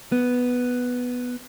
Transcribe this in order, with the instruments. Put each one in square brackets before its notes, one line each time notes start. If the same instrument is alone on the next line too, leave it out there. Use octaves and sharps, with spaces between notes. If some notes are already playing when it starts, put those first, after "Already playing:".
[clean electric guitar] B3